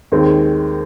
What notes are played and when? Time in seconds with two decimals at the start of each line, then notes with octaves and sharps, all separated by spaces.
0.12 D#2 D#3 G#3 C4